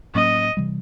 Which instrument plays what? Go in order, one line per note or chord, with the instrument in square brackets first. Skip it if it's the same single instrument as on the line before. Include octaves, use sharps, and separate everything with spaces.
[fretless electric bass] A2 F#3 A#3 C#4 [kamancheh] D#5
[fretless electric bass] C3 E3 G3